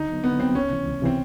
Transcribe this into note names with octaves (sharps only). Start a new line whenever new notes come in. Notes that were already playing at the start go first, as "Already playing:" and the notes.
Already playing: D3 D#4
F#3 B3
D3 B3
F#3 B3 C4
C#2 C#4
C3 E3
C#2
C3 E3 C4